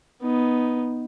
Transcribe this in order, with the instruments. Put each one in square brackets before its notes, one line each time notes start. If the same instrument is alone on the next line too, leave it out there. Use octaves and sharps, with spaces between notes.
[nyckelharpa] B3 D#4